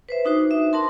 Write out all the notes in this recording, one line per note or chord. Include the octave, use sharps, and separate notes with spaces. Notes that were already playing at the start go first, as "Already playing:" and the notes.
B4 C5 E5
D4 D#4 F#4 C5
E5
D4 A#4 A5 C6